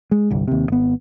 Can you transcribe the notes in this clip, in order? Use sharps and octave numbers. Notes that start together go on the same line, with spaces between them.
G#3
G1 C2
D#2 C3
G#1 B3